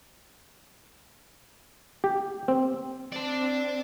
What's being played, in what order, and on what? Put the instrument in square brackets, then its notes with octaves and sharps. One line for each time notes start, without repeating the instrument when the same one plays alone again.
[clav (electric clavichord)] G4
C4
[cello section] C4 [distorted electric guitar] D5 A5